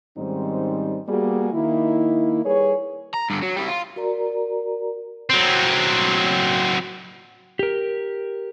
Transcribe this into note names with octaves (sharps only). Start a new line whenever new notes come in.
G#2 D#3 G3 C4 C#4 D#4
G3 A#3 B3 F#4 G#4
D#3 A#3 D#4 E4
G3 G#4 A#4 B4 C#5
A#5
G2 D3
F#3
G3 E4
F4
F#4 A#4 D5 A#5
F#3 C4
G4 A#4